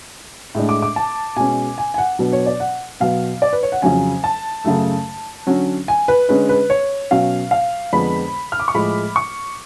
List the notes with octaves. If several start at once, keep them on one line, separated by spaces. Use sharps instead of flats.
A2 G#3 D4
D6
D6
A5
B2 G#3 C#4 G#5
G#5
G#5
F#5
B2 F#3 B3 D4
C#5
D5
F#5
B2 F#3 B3 F5
D5
B4
C#5
F#5
F2 C#3 F#3 C#4 G#5
A5
F#2 C#3 F#3 A3
D3 F#3 C#4
G#5
B4
D3 G#3 C#4 B4
B4
C#5
B2 F#3 C#4 F5
F5
F2 D3 G#3 B3 D4 B5
F6
D6
C#6
A2 F3 G#3 B5
C#6